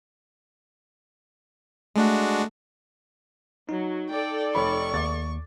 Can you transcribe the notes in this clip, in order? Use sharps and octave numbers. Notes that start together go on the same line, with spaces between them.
G#3 A3 D4 F#4 E5
F#3 D#4
A4 D5 G5
F1 C#5 B5 C#6
D#2 D6 A6